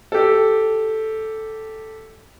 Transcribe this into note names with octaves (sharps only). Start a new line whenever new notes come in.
G4 A4